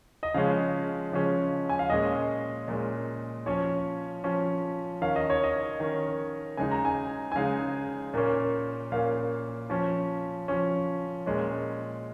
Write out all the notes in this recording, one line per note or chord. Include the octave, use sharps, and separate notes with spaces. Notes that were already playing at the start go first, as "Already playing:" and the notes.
D#5
C#3 F3 G#3 C#4 F5
C#3 F3 G#3 C#4
G#5
F5
A#2 G#3 C#4 D#5
A#2 G#3 C#4
F3 C#4 C#5
F3 C#4
D#3 C#4 F5
D#5
C#5
D#5
D#3 C#4
C#3 G#3 D#4 G#5
A#5
G#5
G#5
C#3 G#3 D#4 F5
A#2 A#3 C#4
A#2 A#3 C#4 F5
F3 C#4
F3 C#4
A#2 G#3 C#4